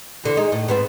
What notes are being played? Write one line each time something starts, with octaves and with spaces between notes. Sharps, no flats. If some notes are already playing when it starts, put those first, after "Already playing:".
E2 D3 C4
G#3 D#4
A2
G#2 B3 C4